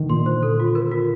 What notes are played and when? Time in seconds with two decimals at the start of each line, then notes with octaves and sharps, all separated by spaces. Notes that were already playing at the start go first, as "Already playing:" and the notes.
Already playing: D3 D#3
0.10 A#2 C6
0.26 C5
0.43 A4
0.60 F4
0.75 A#4
0.91 F4